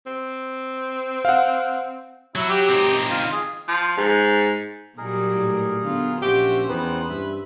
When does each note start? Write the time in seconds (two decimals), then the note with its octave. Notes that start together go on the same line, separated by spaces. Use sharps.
0.06 C4
1.25 F5 F#5
2.35 F#3 E4
2.49 G4
2.69 C4 D#4
3.11 F4
3.32 G#4
3.68 F3
3.97 G#2
4.98 A#2 F#3 G3 D#4 G#4 A#4
5.34 A2
5.82 D3 B3 F4
6.22 A#1 C#4 F#4 G4 C5 E5
6.69 E2 B3 C4 D#4 B4
7.10 G2 E5